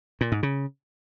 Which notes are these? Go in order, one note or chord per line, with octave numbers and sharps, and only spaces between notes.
A#2
G#2
C#3